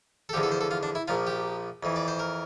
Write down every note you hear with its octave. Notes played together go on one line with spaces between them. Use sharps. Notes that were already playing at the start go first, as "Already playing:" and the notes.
A4
E2 D3 F3 G4
A4
C5
A4
F4
D4
E4
A#1 A#2 F3 F4
G4
F2 E3
D5
C5
A#4